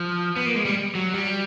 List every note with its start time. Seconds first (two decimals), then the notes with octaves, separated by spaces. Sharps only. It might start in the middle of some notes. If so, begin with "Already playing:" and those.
Already playing: F3
0.36 B3
0.46 A#3
0.56 G#3
0.65 G3
0.95 F#3
1.14 G3